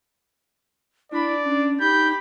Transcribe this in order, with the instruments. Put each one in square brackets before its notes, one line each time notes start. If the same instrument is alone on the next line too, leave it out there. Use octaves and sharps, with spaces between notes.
[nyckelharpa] D4 B5 [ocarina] E4 [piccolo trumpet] D5
[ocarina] C#4 [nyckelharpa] D4
[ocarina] D#4 [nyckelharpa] G4 B5 [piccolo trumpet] G6